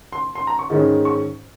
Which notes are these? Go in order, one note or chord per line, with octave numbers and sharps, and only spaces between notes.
C6
C6
A#5
C#6
G#2 D#3 G#3 C#4
C#6